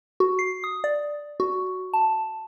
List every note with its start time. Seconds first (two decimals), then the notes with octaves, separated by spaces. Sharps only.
0.20 F#4
0.39 C7
0.64 D#6
0.84 D5
1.40 F#4
1.93 A5